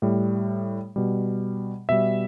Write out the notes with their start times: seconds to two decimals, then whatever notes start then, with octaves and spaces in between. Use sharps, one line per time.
0.02 A2 G3
0.96 B2 G3
1.89 B2 G3 E5